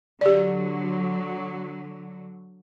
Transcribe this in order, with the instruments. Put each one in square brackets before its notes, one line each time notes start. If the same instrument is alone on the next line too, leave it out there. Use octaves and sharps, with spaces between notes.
[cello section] D3 F#3 [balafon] G4 D5